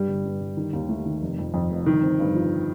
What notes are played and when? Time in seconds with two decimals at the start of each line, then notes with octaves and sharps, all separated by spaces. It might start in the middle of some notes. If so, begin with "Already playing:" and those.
Already playing: G2 G3
0.08 G1
0.25 G2
0.40 G1
0.57 D#3
0.73 D#2
0.89 A3
1.06 D#3
1.22 F1
1.38 F2
1.54 F2
1.71 F1
1.86 G1 D#3
2.02 C4
2.19 G2
2.35 F3